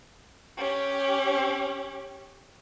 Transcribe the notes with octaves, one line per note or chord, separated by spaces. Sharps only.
C#4 G4